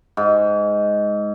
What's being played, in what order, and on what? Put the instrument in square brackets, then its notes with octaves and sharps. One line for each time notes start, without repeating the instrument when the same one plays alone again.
[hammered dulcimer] G#2